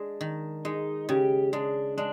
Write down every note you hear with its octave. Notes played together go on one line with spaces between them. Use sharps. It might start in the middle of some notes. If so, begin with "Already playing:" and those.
Already playing: G#3 D4
D#3
G#3 D#4
C#3 G4
G#3 D4
G#3 D4